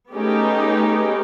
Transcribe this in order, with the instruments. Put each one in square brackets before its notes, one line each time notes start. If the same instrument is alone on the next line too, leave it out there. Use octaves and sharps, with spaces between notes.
[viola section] A3 B3 C#4 D#4 G4 G#4